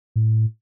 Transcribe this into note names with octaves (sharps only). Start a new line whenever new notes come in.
A2